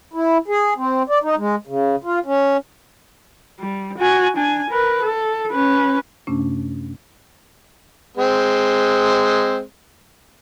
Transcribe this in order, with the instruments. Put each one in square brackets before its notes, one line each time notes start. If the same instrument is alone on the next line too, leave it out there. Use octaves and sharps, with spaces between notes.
[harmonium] E4
G#4
C4
D5
D#4
G#3
C#3
F4
C#4
[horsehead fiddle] G3
F#4 G#5
D4 G#5
A#4 B4
A4
C#4 B4
[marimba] F#2 C3 A3 C#4 D4
[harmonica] G#3 C4